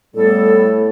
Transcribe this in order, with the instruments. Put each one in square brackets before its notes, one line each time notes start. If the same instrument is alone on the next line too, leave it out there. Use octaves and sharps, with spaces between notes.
[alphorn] A2 [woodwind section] G3 B3 A4